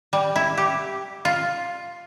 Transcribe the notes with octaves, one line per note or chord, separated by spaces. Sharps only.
G3
E4
G4
F4